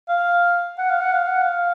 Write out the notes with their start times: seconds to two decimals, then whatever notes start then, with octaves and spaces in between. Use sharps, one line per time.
0.09 F5
0.79 F#5
0.90 F5
1.01 F#5
1.12 F5
1.27 F#5
1.42 F5